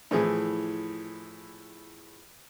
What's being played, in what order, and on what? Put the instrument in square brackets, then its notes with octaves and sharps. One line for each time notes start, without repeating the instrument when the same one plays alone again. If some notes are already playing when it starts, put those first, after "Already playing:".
[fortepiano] A2 E3 F3 G#4